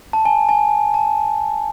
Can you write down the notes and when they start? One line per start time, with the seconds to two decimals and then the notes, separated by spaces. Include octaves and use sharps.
0.13 A5
0.25 G#5
0.49 G#5
0.94 A5